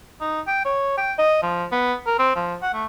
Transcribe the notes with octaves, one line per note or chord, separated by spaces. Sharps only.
D#4
G5
C#5
G5
D#5
F3
B3
A#4
C4
F3
F#5
A3